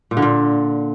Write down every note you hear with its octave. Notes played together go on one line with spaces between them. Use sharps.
A#2
D3
A#2